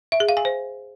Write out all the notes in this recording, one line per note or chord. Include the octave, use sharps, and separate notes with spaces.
E5
G#4
F5
G#5
C5